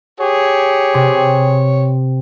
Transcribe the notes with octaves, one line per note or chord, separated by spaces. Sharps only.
G4 G#4 C#5
C3